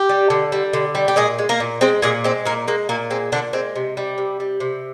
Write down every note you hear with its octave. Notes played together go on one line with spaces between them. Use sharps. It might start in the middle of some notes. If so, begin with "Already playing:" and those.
Already playing: G4
G3
D3
G3
D3
G3
G4
A#2 G#3 G#4
G#3
A#3 A#4
A#2
G#3 C4 C5
A#2 G#3 G#4
G#3 C4
A#2 A#3
G#3 A#3
A#2 A#3
G#3 C4
A#2 D3 D4
G#3 C4
C3
G3
C3
G3
C3